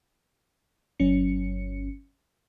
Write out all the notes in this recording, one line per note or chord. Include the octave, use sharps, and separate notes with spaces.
G1 F#3 C#4 C#7